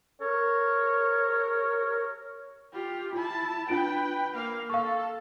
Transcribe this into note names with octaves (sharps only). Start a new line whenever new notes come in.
A#4 C#5
F4 G4
E4 F4 A5
D4 F4 B4 G5 D7
A#3 F5
A4 F5 C#6